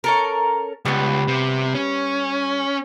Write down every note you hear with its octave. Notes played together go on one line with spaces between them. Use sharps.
C#4 A4 A#4
C#2 G3 B3
C3
C#4